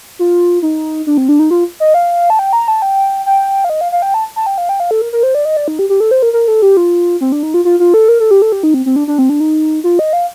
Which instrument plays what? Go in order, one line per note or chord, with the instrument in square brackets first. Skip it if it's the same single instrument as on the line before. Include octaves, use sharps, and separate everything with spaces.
[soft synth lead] F4
D#4
D4
C4
D4
D#4
F4
D#5
F5
A5
G5
A#5
A5
G5
G5
F5
D#5
F5
F5
G5
A5
A5
G5
F5
G5
F5
A4
A#4
A#4
C5
D5
D#5
D5
D#4
G4
G4
A4
C5
A#4
A#4
A4
G4
F4
C4
D4
D#4
F4
F4
F4
A4
A#4
A4
G4
A4
G4
D#4
C4
C4
D4
D4
C4
D4
D#4
F4
D#5
F5